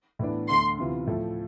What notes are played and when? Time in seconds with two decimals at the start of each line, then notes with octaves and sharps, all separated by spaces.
0.19 A2 E3 B3 D4
0.49 D2 D3 A3 C6
0.78 D2 C3 E3 B3 F4
1.07 A2 F3 A3